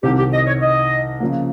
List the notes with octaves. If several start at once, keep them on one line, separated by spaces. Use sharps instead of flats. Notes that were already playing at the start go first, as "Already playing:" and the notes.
C2 C3 D#3 G4
G4
D#5
C#5
D#5
C#3 F3 A#3